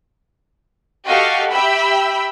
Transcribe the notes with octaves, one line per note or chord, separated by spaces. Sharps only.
F#4 G4 A4 D#5 F5 C#6
G4 E5 G5 B5 E6